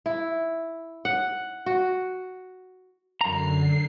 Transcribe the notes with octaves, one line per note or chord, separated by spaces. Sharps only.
E4
F#5
F#4
F#2 D3 A#5 C7